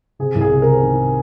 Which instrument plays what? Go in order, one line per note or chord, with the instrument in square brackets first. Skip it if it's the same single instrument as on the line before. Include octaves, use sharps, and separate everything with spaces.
[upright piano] C3 G#4
C2
G#4
C3
C3 A#4
D#3